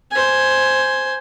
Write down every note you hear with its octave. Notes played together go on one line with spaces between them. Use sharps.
C5 G#5